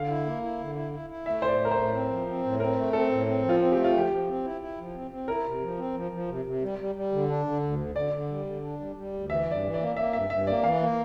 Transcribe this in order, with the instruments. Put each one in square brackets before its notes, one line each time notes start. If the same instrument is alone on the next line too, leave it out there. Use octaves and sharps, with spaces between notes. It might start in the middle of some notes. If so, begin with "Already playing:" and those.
Already playing: [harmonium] D3 [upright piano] F5
[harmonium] E4
A#3
E4
D3
E4
E4
E4
[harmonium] A3 [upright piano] E5
[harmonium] A2 [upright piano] C5
[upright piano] D5
[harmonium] A3
[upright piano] A#4
C5
[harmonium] A2
C4
F3
C4
A2
[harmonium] C4 [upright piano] A#4
[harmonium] A3
[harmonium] C4 [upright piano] A4
[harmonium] A2
C4
F3
[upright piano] F4
[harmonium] C4
[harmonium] A3 [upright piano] G4
[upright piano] F4
[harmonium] F3 [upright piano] G4
[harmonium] F3
C4
E4
E4
F3
C4
C4
[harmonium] E4 [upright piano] A#4
[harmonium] C3
F3
C4
F3
F3
C3
C3
G3
G3
G3
D3
D4
D3
D2
D3
[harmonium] D3 [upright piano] D5
[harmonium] D3
G3
D3
D4
G3
G3
D2
[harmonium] E3 [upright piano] E5
[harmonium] G2 [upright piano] D5
[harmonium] E3
[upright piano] D5
[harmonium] A#3
[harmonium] A#3 [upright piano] E5
[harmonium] G2 [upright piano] E5
[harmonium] G2 [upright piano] E5
[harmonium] A#3 [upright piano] D5
[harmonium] E3 [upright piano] F5
[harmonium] A#3